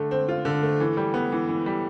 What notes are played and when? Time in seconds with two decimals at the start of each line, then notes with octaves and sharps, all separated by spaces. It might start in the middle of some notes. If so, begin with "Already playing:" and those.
Already playing: D3 A3
0.11 C4
0.29 F4
0.45 D3
0.63 A3
0.80 E3
0.97 G3
1.14 B3
1.32 E3
1.49 E3
1.66 G3